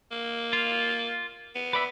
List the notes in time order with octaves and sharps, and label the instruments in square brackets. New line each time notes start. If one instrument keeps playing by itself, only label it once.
[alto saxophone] A#3
[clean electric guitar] F4
[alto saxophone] B3
[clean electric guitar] B4 D5 E5